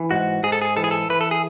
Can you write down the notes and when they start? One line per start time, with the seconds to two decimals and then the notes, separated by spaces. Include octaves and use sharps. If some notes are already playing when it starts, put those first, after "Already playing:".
Already playing: E3
0.11 G#2 F#4
0.44 G#2 G#4
0.52 A4
0.62 G#4
0.77 E3 A4
0.84 G#4
0.91 A4
1.10 E3 B4
1.21 A4
1.31 G#4